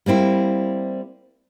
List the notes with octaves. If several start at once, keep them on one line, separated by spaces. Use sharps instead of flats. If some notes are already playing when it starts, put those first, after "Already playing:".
G3 A#3 C4 E4